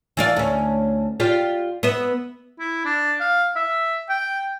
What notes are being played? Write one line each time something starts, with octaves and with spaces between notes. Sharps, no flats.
E3 F4 D5
D2 C#4
F4 G4 D5
B3 E5
E4
D4
F5
E5
G5